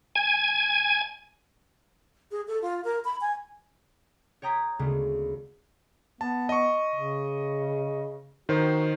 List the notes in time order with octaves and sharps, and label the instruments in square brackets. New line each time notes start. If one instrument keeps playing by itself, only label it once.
[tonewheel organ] G#5
[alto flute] G#4
A4
F4
A#4
B5
G#5
[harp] C#5 G5 A#5 D#6 G#6 B6
D2 C#3 G#3 B3
[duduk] B3 [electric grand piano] A5
[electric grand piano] D#5 C#6
[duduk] C#3
[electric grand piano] D#3 C5 [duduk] F#4